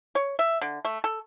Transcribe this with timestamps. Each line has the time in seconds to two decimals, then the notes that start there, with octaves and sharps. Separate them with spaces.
0.15 C#5
0.39 E5
0.62 D3
0.85 A3
1.04 A4